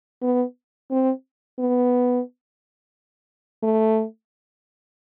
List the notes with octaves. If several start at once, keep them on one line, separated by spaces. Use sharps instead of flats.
B3
C4
B3
A3